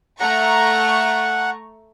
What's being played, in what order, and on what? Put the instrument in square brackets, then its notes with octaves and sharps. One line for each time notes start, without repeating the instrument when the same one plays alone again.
[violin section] A3 A#5 C#6 [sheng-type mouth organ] F#5